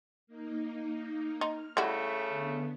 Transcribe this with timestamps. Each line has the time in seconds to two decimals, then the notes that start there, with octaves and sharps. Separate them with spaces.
0.27 A#3 D#4
1.41 D#4 F6
1.77 C#3 G3 A3 E4 F#4 G5 B5 C#6
2.29 D3 B3